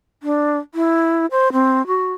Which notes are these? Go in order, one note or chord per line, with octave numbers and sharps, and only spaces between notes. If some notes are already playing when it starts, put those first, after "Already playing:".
D4
E4
C5
C4
F#4